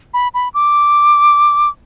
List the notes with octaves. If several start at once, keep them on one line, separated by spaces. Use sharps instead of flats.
B5
B5
D6